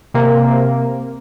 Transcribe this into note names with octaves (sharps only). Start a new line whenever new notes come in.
C3 A#3